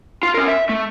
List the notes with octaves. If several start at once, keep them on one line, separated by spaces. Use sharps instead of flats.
F4
C#4 A#4
E5
A3